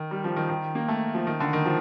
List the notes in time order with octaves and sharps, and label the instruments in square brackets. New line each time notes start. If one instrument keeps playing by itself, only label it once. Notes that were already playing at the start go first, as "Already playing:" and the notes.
Already playing: [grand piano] D#3
G3
F3
D#3
D#3
A#3
A3
F3
D#3
D3
D#3
F3